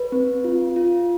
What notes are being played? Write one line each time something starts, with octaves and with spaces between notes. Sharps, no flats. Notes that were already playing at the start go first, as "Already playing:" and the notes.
Already playing: B4
C4
F4
F4